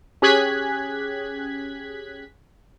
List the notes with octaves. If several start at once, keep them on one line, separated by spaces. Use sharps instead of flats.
C#4 G4 G#4 F#6 G#6 B6